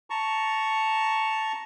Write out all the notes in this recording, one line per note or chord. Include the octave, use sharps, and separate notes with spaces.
A5 A#5 C#6